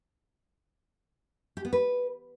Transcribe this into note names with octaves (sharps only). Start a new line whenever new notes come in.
G4
B3
B4